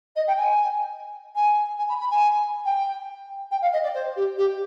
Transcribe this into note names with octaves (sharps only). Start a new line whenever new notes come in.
D#5
G5
G#5
G#5
G#5
B5
B5
G#5
G5
G5
F5
D#5
D5
C5
G4
G4